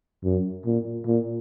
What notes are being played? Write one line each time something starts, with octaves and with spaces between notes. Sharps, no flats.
F#2
A#2
A#2